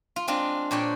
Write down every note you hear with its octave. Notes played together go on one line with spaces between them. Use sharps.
F4
G#3 C4 D4 F4
A#2 D4 C#5 G5